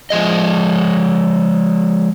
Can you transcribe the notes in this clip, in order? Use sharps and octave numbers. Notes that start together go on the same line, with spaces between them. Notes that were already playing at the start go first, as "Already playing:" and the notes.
F3 G#3 D#5